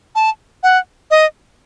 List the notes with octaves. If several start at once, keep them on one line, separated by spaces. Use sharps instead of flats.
A5
F#5
D#5